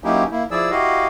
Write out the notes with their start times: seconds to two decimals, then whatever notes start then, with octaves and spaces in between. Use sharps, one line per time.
0.04 F#3 A#3 C#4 D#4 E4 G4
0.31 A#3 E4
0.51 F3 E4 G#4 D5 E6
0.71 E4 F#4 G4 D#5 F5